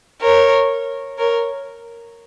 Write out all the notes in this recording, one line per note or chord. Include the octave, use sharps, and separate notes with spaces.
A#4 C#5
A#4 C#5